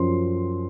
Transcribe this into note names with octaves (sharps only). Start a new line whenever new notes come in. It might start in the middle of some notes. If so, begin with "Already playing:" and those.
Already playing: F#2 F3 C6